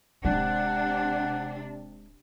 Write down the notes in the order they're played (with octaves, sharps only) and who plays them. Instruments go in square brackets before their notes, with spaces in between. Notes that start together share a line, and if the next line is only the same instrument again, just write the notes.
[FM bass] D1 [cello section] C3 D4 [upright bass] G#3 [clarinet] F#5